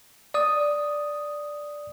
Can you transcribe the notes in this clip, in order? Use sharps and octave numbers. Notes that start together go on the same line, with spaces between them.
D5 D#6